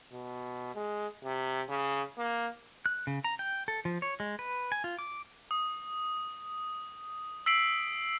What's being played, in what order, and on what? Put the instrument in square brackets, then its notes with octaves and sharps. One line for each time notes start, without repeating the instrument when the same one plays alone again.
[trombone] B2
G#3
C3
C#3
A#3
[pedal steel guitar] F#6
C#3
A#5
G5
A4
F3
C#5
G#3
B4
G#5
F4
D6
[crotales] D#6
E6 B6 C7 D7 F#7